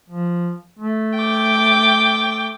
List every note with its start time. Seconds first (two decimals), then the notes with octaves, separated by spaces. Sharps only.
0.10 F3
0.79 A3
1.17 G5 D6